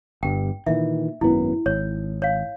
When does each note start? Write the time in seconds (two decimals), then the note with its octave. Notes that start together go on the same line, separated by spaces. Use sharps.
0.23 G1 G2 G5
0.66 A#2 D#3 E3 E5
1.21 G#1 F#2 B3 E4
1.66 G#1 C#5
2.22 C#5 F5